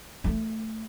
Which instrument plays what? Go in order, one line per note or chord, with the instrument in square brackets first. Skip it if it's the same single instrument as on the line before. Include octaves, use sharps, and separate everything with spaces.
[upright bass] A3